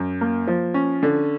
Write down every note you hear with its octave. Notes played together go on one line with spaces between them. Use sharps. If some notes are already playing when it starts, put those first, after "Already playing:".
Already playing: F#2
A#3
F3
C#4
D3